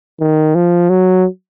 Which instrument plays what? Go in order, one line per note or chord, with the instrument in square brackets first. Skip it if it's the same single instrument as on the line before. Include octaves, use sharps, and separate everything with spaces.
[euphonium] D#3
F3
F#3